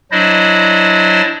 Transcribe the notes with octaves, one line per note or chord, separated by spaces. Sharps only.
F#3 D4 E4 C5 D5 D#5